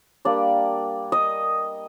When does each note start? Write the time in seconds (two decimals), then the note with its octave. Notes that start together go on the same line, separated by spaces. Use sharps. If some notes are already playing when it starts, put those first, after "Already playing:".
0.25 G3 A#3 D4 D5
1.12 D#5